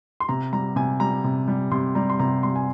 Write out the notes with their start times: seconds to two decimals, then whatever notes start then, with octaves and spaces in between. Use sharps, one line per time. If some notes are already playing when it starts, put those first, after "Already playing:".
0.20 C6
0.29 C3 A#5
0.52 G3 A#5
0.76 C3 G#5
1.00 G3 A#5
1.24 C3
1.48 G3
1.71 C3 C6
1.95 G3 A#5
2.10 C6
2.19 C3 A#5
2.43 G3 C6
2.56 G#5